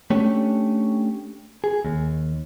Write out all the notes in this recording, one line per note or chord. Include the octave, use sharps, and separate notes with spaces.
A3 C#4 D4 G4 C#5
G#4
D#2